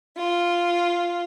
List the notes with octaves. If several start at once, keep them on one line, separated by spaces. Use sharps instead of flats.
F4